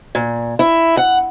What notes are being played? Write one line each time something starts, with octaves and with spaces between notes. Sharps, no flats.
A#2
E4
F#5